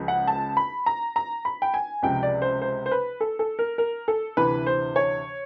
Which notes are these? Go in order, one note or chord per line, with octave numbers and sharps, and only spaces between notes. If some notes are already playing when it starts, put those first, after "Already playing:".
Already playing: C#2 C#3 F3
F#5
A5
B5
A#5
A#5
B5
G5
G#5
C#2 C3 F3 G5
D5
C5
C5
C5
B4
A4
A4
A#4
A#4
A4
D2 C3 E3 B4
C5
C#5